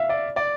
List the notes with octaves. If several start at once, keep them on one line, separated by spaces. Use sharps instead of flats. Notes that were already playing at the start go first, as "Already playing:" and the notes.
Already playing: E5 F5
D5
D5